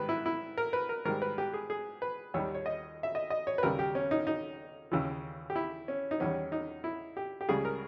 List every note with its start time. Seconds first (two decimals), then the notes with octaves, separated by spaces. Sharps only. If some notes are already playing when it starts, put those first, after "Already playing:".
Already playing: G#2 D#3 G3 B4
0.09 E4
0.26 E4
0.57 A#4
0.73 B4
0.89 A#4
1.05 G#2 D#3 G3 A#4
1.22 B4
1.38 G4
1.53 G#4
1.70 G#4
2.02 B4
2.34 D#2 D#3 G3 C#5
2.54 C#5
2.66 D#5
3.03 E5
3.15 D#5
3.30 D#5
3.47 C#5
3.58 B4
3.63 D#2 C#3 G3 A#4
3.79 G4
3.95 C#4
4.11 D#4
4.27 D#4
4.92 D#2 C#3 E3
5.50 G4
5.56 E4
5.88 C#4
6.11 D#4
6.20 E2 D#3 G3 C#4
6.52 D#4
6.84 E4
7.17 G4
7.41 G4
7.49 C#2 C#3 G3 G#4
7.65 A#4